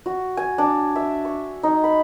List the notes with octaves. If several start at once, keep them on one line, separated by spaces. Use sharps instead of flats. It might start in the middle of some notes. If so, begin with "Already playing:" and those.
F#4
G#5
D4
E5
C#6
D#4
B5